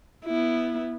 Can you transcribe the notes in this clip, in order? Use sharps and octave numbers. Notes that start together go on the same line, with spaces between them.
B3 E4